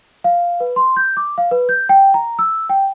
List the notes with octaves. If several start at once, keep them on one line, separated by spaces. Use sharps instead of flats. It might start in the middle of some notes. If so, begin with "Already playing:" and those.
F5
B4
C6
G6
D6
F5
B4
G6
G5
A#5
E6
G5